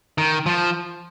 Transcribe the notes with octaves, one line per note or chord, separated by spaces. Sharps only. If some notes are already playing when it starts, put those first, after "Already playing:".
D#3
F3